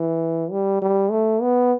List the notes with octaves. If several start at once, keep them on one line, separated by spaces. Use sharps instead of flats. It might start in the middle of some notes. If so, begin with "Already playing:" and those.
Already playing: E3
G3
G3
A3
B3